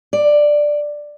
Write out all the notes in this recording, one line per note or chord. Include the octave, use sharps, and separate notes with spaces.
D5